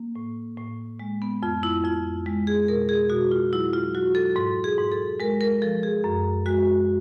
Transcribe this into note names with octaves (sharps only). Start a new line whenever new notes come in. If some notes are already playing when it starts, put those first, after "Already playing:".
Already playing: A#3
A2
A2
G#3
B3
F2 F4
E4
F2 F4
G#3
G#4
B2 A#4
G#4
B2 F#4
F4
F#3 E4
F4
F#3 F#4
A4
G#2 A4
G#4
G#2
A4
G#3 A#4
A#4
F3 A4
G#4
F#2
G#3 F#4